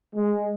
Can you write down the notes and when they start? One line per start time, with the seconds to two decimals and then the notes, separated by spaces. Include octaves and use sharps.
0.15 G#3